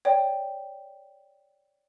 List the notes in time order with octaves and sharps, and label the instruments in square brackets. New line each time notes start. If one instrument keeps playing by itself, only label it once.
[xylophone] C#5 D5 G5